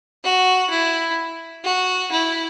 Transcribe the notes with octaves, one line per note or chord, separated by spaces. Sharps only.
F#4
E4
F#4
E4